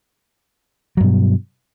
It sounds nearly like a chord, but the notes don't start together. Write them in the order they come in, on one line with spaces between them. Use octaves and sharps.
F#3 G2 B2